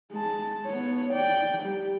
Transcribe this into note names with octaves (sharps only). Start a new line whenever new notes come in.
G#3 A5
B3 C#5
D5 G5
G3 G4